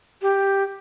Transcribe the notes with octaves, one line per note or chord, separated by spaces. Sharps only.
G4